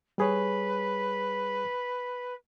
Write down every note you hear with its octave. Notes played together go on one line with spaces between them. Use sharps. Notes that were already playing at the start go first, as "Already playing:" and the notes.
G3 G#4 B4 C#5